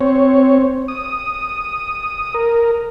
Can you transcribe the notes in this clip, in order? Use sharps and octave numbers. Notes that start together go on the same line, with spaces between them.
C4 C#5
D#6
A#4